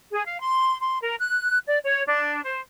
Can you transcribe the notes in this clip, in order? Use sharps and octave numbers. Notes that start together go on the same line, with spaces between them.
G#4
F5
C6
C6
A#4
F#6
D5
C#5
D4
C5